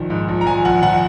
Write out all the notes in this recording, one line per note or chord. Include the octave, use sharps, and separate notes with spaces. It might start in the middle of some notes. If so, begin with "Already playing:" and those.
Already playing: A#1 D#3
G#2
A#1
A#5
A#1 G#5
A#1 F#5
A#1 F#5